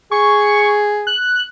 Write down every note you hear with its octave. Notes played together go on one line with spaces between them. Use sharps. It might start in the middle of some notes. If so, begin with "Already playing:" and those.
G#4 C#6
F#6